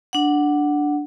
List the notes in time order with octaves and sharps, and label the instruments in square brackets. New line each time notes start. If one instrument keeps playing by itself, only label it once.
[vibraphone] D4 F#5